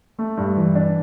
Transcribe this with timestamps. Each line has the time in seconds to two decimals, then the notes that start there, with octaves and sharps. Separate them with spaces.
0.19 A3
0.37 G2
0.57 E3
0.75 D4